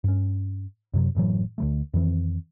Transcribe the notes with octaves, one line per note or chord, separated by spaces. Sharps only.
G2 C#4
F#2 C3 F#3
F#1 A2 E3 F#3
D2 G3 A3
F2 D#3 E3 C4